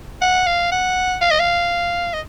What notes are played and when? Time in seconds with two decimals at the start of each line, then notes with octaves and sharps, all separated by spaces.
0.21 F#5
0.47 F5
0.71 F#5
1.21 F5
1.30 D#5
1.40 F5
2.13 D#5